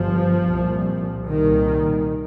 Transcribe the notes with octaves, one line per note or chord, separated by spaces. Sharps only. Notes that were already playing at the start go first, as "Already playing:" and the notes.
Already playing: G1 G2 F3
C2 A#2
C2 A#2 D#3